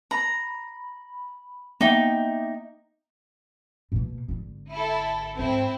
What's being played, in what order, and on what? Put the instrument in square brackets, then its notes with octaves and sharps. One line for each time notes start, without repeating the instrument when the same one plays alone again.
[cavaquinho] A#5 [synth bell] B5
[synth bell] A#3 B3 E5 [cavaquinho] D#4 G5
[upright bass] B2 A#3
G#1 D3
[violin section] E4 A4
[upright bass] G#2 [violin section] C4 E4 C5